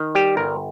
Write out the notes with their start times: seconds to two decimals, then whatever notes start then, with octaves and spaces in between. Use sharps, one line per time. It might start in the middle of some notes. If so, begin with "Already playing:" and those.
Already playing: D#3
0.15 G3 G4
0.37 G1 A#4